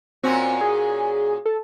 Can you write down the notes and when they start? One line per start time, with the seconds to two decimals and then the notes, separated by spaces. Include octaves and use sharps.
0.23 A#2 C4 C#4 F#4
0.61 G#4
1.46 A4